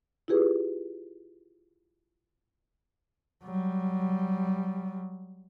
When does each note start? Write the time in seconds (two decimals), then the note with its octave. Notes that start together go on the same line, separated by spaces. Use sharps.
0.28 E4 F4 G4 G#4 B4
3.45 F#3 G3